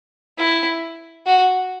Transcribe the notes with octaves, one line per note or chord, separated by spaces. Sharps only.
E4
F#4